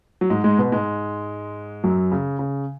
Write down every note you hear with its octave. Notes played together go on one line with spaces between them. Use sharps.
F#3
G#2 G#3
G#2 G#3
B2 B3
G#2 G#3
F#2 F#3
C#3
C#3